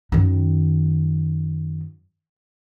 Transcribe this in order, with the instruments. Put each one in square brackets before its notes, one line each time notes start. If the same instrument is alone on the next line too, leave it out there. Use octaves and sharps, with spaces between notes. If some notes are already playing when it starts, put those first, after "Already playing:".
[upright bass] F#2 D#3